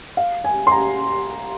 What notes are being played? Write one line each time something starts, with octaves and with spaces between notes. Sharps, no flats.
F5
G#5
C6
A#5